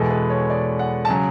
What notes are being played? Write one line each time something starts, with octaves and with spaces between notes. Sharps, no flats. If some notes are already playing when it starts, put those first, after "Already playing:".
Already playing: E2 B2 G#3 A4
B4
C#5
D5
F#5
A5
C#3 F#3 G#5